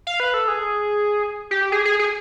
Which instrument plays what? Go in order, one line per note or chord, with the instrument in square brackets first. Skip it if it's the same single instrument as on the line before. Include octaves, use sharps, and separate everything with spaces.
[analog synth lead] F5
B4
A4
G#4
G4
G#4
G#4
G#4